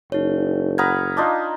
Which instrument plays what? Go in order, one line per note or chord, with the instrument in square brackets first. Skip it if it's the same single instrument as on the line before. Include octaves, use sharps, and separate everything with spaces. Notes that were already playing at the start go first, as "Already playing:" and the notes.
[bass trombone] F#1 [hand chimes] D#4 C#5
[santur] F#5 A#5 B5 [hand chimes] D#6 F6 G#6
[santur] D4 D#4 F4